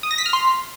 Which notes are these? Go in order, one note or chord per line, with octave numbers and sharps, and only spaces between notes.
D#6
A#6
B6
F6
C6